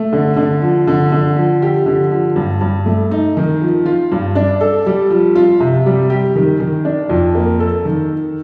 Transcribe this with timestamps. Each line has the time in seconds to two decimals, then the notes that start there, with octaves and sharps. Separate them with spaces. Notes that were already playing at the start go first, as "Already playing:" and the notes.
Already playing: A3
0.13 D3
0.36 D3
0.62 F3
0.87 D3
1.12 D3
1.36 F3
1.62 G4
1.86 D3
2.11 F3
2.36 G2
2.61 G2
2.86 A3
3.11 D#4
3.37 D#3
3.62 F3
3.86 F4
4.12 G2
4.35 D4
4.61 A4
4.86 G3
5.10 F3
5.35 F4
5.60 C3
5.86 G3
6.10 G4
6.36 D#3
6.60 D#3
6.85 D4
7.10 F2
7.35 A#3
7.60 A4
7.85 D#3